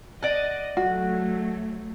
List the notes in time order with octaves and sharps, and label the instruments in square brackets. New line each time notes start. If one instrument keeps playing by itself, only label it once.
[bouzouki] D5 F#5 [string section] D#5
[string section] F#3 A3 [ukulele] F#4